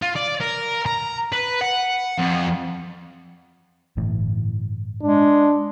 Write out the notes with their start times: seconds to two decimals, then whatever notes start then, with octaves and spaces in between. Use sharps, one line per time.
0.02 F4
0.16 D5
0.41 A#4
0.86 A#5
1.32 B4
1.61 F#5
2.19 F2
3.97 G1 A2 E3
5.02 G#3 D4